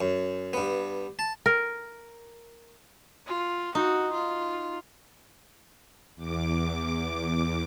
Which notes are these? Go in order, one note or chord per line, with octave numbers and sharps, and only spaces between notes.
F#2
G2 B3
A5
A#4
F4
D#4 F#4
F4
E2 D6